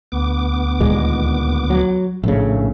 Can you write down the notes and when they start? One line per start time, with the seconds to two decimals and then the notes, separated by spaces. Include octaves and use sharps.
0.12 D2 B3 D6
0.81 D#2 A#2 G#3
1.70 F#3
2.24 A#1 A2 C#3 A3